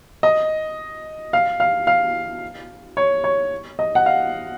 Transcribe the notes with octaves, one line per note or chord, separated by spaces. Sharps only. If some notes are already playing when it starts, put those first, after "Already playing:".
D#5
F5
F5
F5
C#5
C#5
D#5
F#5
F5